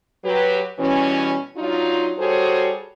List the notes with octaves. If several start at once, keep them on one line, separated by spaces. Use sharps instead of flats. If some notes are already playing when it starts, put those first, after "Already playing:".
F#3 G4 B4
B2 E3 G3 C#4
F#3 D4 D#4 F4
G3 F#4 G#4 A4 C5 C#5